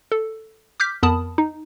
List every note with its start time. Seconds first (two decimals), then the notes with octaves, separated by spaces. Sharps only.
0.12 A4
0.80 D6 F6 G6 B6
1.03 F2 B3 A#4 A5 B5 D#6
1.38 D#4